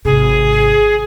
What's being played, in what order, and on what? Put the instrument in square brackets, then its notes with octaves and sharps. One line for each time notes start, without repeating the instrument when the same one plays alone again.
[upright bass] G#1 C3 [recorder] G#4